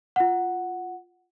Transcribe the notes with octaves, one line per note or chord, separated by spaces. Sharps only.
F4 F#5